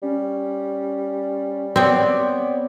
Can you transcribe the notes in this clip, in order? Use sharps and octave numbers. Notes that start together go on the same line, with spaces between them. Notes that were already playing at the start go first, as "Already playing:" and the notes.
G3 C#4
B3 C4 C#5 D5